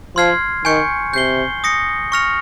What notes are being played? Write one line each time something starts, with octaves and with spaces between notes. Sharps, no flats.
F3 C6 F6 G#6 C7
D#3 G#5 C#6 G6 C#7
C3 G6 C7 G7
D#6 A#6 C#7
C#6 F6 A#6 C#7 F7